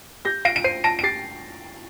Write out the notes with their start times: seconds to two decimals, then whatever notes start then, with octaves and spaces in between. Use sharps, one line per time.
0.25 G4 G6 A#6
0.45 F5 A#6 D7
0.56 D7
0.64 C5 C7 D#7
0.84 A5 A#6 D7
0.99 D7
1.03 G4 A6 C7